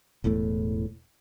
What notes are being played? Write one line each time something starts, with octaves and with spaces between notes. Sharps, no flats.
E1 E2 A2 A3